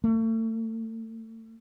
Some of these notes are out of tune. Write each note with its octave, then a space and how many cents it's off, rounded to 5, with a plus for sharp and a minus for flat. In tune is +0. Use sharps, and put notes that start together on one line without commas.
A3 +35